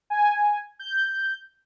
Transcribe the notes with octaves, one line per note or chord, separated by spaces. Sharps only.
G#5
G6